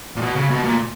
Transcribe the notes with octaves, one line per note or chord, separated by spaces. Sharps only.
A#2
B2
C#3
B2
A#2